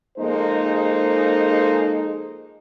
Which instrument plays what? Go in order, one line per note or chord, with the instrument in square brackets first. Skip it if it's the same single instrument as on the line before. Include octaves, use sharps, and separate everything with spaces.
[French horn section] F3 G#3 A#3 D#4 A4 C5